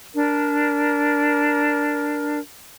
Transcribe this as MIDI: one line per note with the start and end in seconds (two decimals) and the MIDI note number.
0.14 2.38 62
0.14 2.38 70